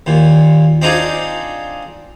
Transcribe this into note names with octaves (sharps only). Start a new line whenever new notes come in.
D#2 A#2
C4 D4 D#4 F4 G#4